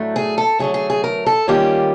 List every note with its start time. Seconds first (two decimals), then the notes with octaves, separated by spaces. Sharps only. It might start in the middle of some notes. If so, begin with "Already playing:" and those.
Already playing: A2 F#3 A3 D4
0.16 G#4
0.38 A4
0.59 D3 F#3 A3 G#4
0.74 G#4
0.90 G#4
1.04 A#4
1.26 A4
1.47 D#3 G3 A#3 C#4 F4 G4